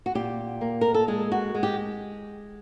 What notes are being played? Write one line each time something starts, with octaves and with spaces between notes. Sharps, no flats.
F#4
A#2 G4
A#3
A#4
A4
G#3 G#4
F#4
G#3
G4